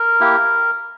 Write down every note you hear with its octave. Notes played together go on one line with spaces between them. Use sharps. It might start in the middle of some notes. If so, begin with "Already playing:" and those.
Already playing: A#4
A#3 E4 G4